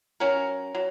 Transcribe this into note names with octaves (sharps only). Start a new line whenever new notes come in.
F#3 C#4 F#4 A#4
F#3